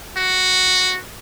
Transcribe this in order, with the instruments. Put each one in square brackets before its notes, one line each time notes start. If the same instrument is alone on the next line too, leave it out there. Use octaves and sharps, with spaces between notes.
[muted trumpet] F#4